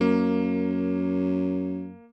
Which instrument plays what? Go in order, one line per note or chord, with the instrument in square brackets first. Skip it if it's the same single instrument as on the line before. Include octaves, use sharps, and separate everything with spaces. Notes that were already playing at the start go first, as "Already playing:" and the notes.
[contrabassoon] F#2 [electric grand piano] A#3